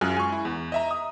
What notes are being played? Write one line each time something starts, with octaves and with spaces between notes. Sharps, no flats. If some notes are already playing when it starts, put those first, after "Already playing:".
F#2 G#3 F4 G#5 F6 F#6
G#5 C#6
E4
E2
D#5 E5 A#5
D#6